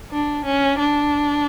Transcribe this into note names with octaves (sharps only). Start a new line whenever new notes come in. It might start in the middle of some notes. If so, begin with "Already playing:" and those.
D4
C#4
D4